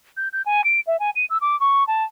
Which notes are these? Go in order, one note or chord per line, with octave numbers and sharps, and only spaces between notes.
G6
G6
G#5
D7
E5
G#5
D#7
E6
D6
C#6
A5